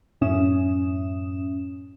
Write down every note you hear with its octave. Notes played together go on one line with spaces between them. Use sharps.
F#2 A2 C#4 E5 D#6 E7